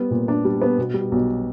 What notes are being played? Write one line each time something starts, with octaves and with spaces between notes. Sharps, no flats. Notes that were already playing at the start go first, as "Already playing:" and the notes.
Already playing: G3 B3
A#2
D4
G3
B3
B2
G3
B1